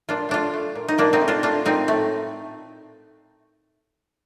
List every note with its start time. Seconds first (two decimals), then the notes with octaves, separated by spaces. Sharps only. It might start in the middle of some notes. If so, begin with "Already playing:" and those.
0.09 A#2 D4 F4
0.29 A3 D4 F4
0.54 A3
0.75 A#2
0.88 D#4
0.98 A#2 A#3 D4
1.13 C4 D#4
1.21 A3
1.28 D4 F4
1.43 A3 D4 F4
1.65 A#2 C4 D#4
1.88 A2 A3